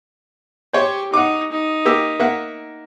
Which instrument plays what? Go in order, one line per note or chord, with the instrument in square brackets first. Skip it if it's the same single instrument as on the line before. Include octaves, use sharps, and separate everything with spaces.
[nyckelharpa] G4 [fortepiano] C5 C#5
[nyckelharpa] D#4 [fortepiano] F#5 D6
[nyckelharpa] D#4
[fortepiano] A#3 G4 E6
A#3 E5 F#5